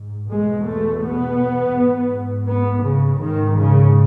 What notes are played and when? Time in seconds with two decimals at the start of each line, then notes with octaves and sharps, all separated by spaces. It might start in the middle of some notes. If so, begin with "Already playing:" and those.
Already playing: G#2
0.30 E2 B2 G#3
0.66 A3
1.03 B3
1.76 G#2
2.47 B3
2.83 C#3
3.20 G#2 D#3
3.57 C#3